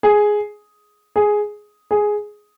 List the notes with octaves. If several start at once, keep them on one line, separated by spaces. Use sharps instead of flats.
G#4
G#4
G#4